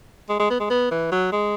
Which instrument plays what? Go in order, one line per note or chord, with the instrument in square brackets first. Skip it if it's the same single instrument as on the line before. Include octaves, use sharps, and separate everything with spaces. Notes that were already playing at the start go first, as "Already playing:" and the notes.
[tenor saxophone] G#3
G#3
B3
G#3
B3
E3
F#3
G#3